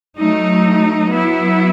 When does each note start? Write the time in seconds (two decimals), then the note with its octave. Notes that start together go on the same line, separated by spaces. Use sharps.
0.19 F#3 A3 D#4
1.13 F#3 B3 E4